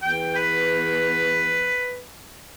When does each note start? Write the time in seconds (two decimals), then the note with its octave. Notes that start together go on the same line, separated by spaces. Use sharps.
0.02 E2 G5
0.36 B4